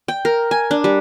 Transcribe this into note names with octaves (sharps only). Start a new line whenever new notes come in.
G5
A#4
G#5
D4
G3